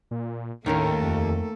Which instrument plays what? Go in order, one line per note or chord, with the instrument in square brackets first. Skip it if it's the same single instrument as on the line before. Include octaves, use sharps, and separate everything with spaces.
[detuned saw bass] A#2
[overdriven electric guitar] D#2 [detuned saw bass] A2 [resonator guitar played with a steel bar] D#3 C#4 A#4 [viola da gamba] A3 A#3 A4
[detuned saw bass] F2